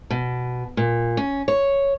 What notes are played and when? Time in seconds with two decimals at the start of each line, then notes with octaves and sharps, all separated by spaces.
0.10 B2
0.77 A#2
1.17 C#4
1.48 C#5